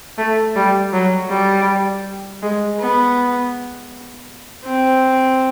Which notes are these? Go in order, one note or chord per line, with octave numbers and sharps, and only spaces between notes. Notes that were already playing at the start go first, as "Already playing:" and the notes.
A3
G3
F#3
G3
G#3
B3
C4